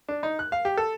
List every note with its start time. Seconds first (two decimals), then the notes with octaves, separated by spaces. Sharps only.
0.09 D4
0.23 D#4
0.39 F#6
0.52 F5
0.65 G4
0.78 A4